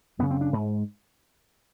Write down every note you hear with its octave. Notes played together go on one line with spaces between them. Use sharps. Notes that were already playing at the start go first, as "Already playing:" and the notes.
F#2 C#3 B3
C4
D4
G#2